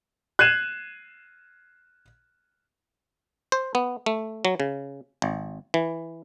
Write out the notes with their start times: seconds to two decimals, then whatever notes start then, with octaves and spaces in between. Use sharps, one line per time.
0.39 F#6 G#6 C7 D#7 E7
3.52 C5
3.75 B3
4.06 A3
4.45 F#3
4.60 C#3
5.22 G#1
5.74 E3